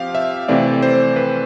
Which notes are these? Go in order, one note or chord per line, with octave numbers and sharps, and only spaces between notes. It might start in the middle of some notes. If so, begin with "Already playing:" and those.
Already playing: F3 C4 G4 F5
E5
C3 E3 A3 C4 D5
C5
B4